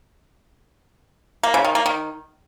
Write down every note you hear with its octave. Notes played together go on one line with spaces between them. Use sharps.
A#3
C#3
D#3
A#3
D#3